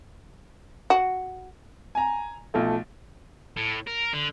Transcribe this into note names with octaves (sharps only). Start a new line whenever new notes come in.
F#4
G#5 A#5
B1 F3 A3
A2
A#4
D3